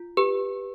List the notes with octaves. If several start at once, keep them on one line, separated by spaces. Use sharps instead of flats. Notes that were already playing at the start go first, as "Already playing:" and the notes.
Already playing: F4
G4 B4